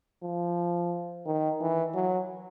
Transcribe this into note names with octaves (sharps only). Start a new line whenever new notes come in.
F3
D#3
E3
F#3